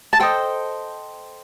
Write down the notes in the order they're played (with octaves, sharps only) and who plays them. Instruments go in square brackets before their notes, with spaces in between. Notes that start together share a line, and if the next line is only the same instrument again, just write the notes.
[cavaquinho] A5
A4 C5 D#5 G5